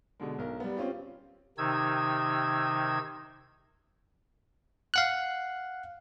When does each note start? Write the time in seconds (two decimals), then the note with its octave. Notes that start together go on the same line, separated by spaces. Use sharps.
0.20 B2 D3 G#3
0.38 B1 A#4
0.60 G3 B3
0.77 C4 C#4 F4 G4
1.58 C3 D#3 D#4 E6 G#6
4.94 F5 F#5 F#6